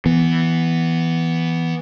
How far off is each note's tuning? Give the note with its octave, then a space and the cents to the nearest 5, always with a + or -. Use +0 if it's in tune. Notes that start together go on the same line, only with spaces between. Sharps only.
E3 +0 B3 +0